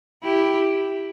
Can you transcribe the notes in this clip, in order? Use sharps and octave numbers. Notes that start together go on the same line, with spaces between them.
E4 G4